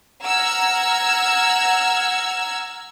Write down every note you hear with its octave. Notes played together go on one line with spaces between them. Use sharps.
F#5 A#5 E6 F6 G#6